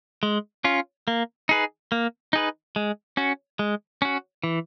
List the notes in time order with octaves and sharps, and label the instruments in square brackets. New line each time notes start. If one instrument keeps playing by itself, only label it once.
[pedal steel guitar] G#3
C#4 F4
A#3
D#4 G#4 B4
A#3
D#4 G#4 B4
G#3
C#4 F#4
G#3
C#4 F#4
E3